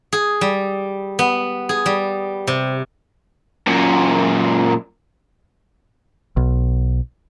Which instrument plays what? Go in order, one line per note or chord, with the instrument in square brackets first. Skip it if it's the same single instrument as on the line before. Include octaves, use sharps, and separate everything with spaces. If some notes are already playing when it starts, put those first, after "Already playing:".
[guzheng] G#4
G3
B3
G#4
G3
C3
[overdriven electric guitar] F#2 A#2
[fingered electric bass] B1